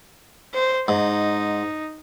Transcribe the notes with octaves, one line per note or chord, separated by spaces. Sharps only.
C5
G#2 D#4